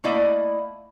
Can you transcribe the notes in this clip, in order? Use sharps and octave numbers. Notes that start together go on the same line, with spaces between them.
A3 A#3 E4 D5 D#5